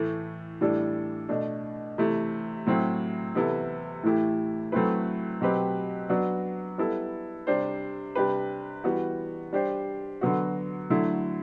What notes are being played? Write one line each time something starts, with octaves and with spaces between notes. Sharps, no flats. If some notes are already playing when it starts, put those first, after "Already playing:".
Already playing: A2 E3 A3
A2 E3 G3 D4 A4
B2 A3 D4
C3 E3 A3 E4
A2 F#3 C4 E4
C3 E3 B3 E4 A4
A2 E3 A3 E4 G4
F#3 A3 C4 E4 B4
B2 F#3 C4 G4 B4
F#3 B3 D4 F#4
G3 B3 E4 A4
C3 G3 D4 G4 C5
C3 G3 D4 G4 B4
E3 G3 B3 F#4
G3 D4 G4 C5
D3 F#3 B3 F#4
D3 F#3 A3 E4